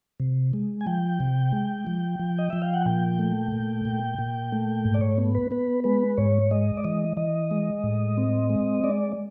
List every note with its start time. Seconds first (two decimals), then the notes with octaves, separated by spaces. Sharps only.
0.20 C3
0.53 G#3
0.81 G#5
0.87 F3 G5
1.20 C3
1.52 G#3
1.87 F3
2.19 F3
2.38 D#5
2.50 F3 E5
2.62 F5
2.74 F#5
2.86 A#2 G5
3.19 A3
3.52 A#2
3.85 A#2
4.19 A#2
4.52 A3
4.85 G#2
4.94 D5
5.01 C#5
5.18 B3
5.35 B4
5.51 B3 B4
5.84 G#3 B4
6.18 G#2 C#5
6.51 G#3 D#5
6.77 D5
6.84 E3 D#5
7.17 E3 D#5
7.51 G#3
7.84 A2
8.17 C4
8.50 G#3
8.84 G#3 D5